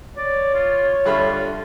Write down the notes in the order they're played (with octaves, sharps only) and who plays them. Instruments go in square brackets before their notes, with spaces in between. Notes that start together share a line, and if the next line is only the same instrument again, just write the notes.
[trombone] C#5 [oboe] D5
[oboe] F4
[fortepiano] G2 D3 B5 [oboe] F4 [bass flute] E5